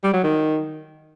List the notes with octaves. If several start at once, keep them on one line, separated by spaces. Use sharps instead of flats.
G3
F#3
D#3